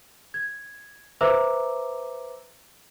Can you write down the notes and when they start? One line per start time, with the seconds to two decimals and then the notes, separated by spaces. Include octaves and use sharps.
0.34 G#6
1.21 B4 C5 E5 A#5 D6 E6